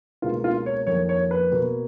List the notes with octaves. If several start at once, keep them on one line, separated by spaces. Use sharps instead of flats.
C#2 B2 A#3 F4
F4
C#5
F2 D#3 A#3 C#5
C#5
B4
B2 A#3